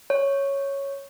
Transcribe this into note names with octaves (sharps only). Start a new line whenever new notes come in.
C#5